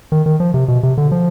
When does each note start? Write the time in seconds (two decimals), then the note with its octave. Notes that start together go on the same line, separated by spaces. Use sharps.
0.12 D#3
0.26 D#3
0.40 F3
0.54 C3
0.68 B2
0.83 C3
0.98 D3
1.11 F3